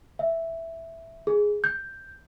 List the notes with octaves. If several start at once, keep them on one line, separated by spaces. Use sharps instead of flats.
E5
G#4
G6